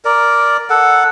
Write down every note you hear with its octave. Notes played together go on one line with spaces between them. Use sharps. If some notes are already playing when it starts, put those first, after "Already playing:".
A#4 D5
A4 F#5